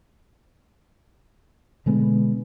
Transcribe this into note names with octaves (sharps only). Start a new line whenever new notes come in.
B2 D3 G#3 B3